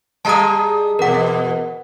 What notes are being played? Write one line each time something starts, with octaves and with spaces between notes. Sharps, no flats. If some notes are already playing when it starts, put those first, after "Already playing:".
G3 G#4 D#5 A5 A#5 D#6
E2 B2 A#4 F#5